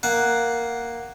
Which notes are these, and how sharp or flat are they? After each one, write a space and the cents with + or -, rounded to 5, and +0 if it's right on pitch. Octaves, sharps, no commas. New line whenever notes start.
A#3 +0 F#5 +0 A5 -45